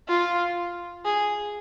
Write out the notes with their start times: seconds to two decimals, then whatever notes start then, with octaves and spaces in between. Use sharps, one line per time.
0.09 F4
1.05 G#4